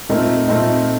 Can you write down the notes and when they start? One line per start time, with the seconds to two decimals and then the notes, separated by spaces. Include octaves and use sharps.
0.09 A#2 A3 C4 D#4 A#4
0.48 A#2 A3 C4 D#4